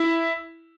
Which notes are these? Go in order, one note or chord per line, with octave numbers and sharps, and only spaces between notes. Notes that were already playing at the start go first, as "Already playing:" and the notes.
Already playing: E4